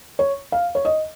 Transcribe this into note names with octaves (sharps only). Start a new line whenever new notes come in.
C#5
F5
C#5
D#5